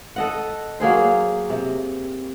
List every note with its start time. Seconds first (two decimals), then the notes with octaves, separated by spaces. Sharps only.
0.16 A4 D#5 F#5
0.80 F#3 A#3 G#4 C5
1.50 C3